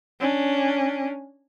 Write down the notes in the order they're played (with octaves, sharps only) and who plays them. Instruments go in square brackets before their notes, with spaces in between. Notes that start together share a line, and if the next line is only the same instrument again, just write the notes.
[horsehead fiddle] C#4 D4